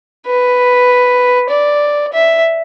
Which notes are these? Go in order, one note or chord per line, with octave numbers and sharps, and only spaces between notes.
B4
D5
E5